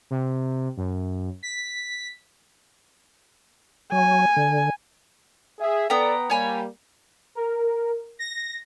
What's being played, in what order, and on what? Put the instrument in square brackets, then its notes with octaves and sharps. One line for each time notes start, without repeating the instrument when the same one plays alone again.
[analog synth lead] C3
F#2
B6
[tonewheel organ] F#3 [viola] G#5
[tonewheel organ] D3
[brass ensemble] G#4 E5
[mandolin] B3 G5 A#5 [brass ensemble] A4 D5
[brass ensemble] G3 A#3 [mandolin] C#5 G#5 B5
[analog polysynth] A#4
A#6